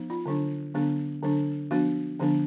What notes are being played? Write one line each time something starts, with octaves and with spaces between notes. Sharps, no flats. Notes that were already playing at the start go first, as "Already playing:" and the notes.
Already playing: F3 B3 D#4
F4
D3 F#3 D4
D3 F#3 B3 D4
D3 F#3 D4
F3 B3 D4 F#4
D3 F3 B3 D4